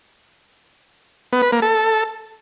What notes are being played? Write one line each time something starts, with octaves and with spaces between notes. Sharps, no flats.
B3
B4
A#3
A4